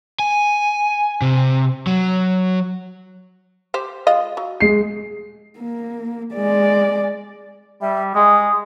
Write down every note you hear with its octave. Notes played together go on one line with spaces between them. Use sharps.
G#5
C3
F#3
G4 C5
G#3 F4 D#5
F#3
G#3 C7
A#3
G#3 D5
G3 E5
G#3 D#6